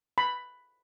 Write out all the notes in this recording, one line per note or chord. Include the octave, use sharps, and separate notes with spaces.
B5